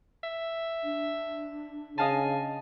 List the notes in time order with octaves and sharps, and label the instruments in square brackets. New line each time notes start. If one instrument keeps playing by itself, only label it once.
[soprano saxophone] E5
[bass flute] D4
[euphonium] C#3 [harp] D#5 F5 A5 [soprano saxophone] G#5